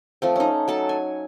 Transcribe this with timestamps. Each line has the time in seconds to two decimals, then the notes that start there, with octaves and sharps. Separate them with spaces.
0.22 F3 A3 C4
0.36 C#4 D#4
0.68 F#3 A4 A5
0.89 G#5